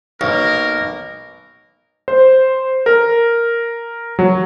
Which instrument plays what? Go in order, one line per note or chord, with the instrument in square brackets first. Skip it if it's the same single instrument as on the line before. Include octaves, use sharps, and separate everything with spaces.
[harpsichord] B1 [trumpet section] A#3 A#4
[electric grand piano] C5
A#4
F#3